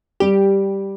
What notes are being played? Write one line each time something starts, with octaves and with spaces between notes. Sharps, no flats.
G3 G4